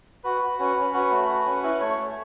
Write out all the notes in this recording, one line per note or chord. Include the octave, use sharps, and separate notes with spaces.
F#4 B4
F#4
C#4 B4
C#4
F#4 B4
A3
F#4
C#4
E4 B4
A3 C#5
A3